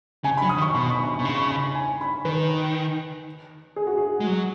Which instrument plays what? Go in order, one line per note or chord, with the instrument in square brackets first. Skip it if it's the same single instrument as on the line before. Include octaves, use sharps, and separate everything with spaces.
[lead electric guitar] C#3 [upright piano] G#5
[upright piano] B5
[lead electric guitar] F#3
[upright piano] D#6
[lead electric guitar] D#3
[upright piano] C#6
[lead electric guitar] B2 [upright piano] B5
[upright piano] C#6
B5
C#6
B5
C#6
[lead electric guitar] B2 [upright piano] B5
[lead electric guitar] C#3 [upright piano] C#6
[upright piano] B5
C#6
B5
G#5
B5
[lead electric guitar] D#3 [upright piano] B4
[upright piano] G#4
F#4
G#4
[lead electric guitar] G#3
F#3